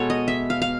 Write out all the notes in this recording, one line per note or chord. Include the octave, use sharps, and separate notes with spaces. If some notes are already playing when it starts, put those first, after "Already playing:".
Already playing: B2 G#3 B3 A4 C#5
D#5
E5
F5
F5